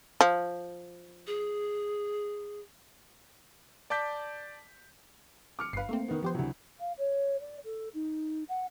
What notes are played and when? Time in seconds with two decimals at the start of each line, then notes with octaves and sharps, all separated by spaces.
0.21 F3
1.27 G#4
3.90 D5 A5 D6 G6 B6
5.59 D6 F6 C#7
5.73 G1 B4 F5 C7
5.89 A3 A#3 C4
6.08 D#3 B3
6.23 F3 B3 G4 C5
6.35 D2 C3 E3 F#3
6.79 F5
6.98 C#5
7.40 D5
7.64 A4
7.94 D#4
8.49 F#5